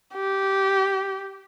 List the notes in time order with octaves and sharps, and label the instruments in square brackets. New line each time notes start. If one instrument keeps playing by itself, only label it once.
[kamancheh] G4